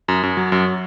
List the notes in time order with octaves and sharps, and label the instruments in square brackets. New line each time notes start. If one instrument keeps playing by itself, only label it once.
[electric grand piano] F#2
F#2
F#3
F#2